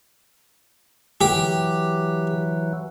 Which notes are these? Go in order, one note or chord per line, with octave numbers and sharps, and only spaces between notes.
E3 F#3 G4